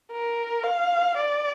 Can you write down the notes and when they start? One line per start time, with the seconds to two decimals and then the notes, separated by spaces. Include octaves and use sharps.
0.11 A#4
0.64 F5
1.17 D5